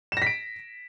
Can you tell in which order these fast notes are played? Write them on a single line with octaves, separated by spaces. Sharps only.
E7 A#6 B6 D7